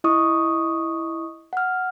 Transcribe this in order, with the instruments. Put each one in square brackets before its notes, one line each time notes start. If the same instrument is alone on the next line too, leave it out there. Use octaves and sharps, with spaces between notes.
[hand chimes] E4 D#5 C#6 D#6
F#5 F6